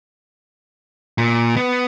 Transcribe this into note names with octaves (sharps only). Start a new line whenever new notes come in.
A#2
B3